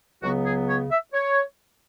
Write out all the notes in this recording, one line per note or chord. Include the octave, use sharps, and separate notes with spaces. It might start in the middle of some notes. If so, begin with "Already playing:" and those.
C#2 C#3 F#3 B3 F#4
G#4
C#5
E5
C#5